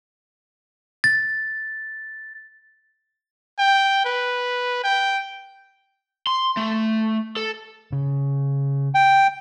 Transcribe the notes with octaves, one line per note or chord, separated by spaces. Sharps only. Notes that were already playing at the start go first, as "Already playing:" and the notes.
A6
G5
B4
G5
C6
A3
A4
C#3
G5